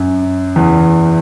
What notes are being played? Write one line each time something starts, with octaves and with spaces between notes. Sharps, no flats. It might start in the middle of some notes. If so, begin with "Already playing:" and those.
Already playing: F#2
E2